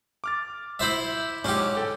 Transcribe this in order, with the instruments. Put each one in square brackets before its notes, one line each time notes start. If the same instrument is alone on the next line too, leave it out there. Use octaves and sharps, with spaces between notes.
[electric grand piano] D6 F6 A6
[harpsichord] E4 C5 E5
[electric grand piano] G#2 [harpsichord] C#4 G4
[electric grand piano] A4 G5